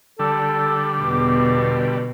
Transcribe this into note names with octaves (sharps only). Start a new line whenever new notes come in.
D3 G3 A4
E2 B2